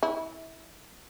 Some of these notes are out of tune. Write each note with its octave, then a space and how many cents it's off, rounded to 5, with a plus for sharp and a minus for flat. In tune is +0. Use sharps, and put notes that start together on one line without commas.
E4 -25